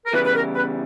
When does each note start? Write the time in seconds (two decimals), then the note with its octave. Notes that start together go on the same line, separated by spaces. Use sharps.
0.06 A#4
0.13 E2 C#3 E3 G3 B4
0.25 B4
0.34 A#4
0.55 B4